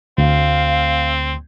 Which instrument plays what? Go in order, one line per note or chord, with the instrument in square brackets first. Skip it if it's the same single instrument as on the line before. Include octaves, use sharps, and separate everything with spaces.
[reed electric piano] D2 [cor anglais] C4 [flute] F5